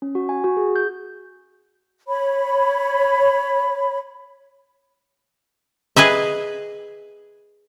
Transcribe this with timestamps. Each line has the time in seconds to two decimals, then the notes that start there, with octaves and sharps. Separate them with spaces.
0.02 C#4
0.15 F#4
0.29 G#5
0.44 F#4
0.57 G#4
0.76 G6
2.08 C#5 B5
5.96 G#4 B4 D#5 E5